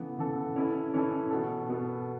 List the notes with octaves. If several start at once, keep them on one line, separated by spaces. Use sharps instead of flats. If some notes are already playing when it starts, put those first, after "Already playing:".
Already playing: C#3 E3 B3 A4
C#3 E3 B3 A4
E3 C#4 E4 A4
E3 C#4 E4 A4
B2 B3 A4
B2 B3 A4